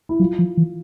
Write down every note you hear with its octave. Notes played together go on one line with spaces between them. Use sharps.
E4
F#3 F4
F3
E3